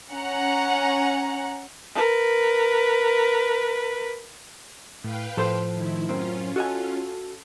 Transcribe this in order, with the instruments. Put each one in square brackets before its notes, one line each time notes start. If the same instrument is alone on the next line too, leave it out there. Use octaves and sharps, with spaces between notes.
[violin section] C#4 F#5 A#5
[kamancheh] A#4 B4
[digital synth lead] A2 [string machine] B4 F5 G5
[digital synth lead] A2 [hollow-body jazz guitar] F3 A4 C5
[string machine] D#3 E4
[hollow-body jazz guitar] F#2 C4 [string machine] C#4 F4
[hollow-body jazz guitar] F#4 D#5 G#5 [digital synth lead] A4